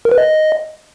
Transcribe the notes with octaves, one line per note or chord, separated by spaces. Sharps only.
A#4
B4
D#5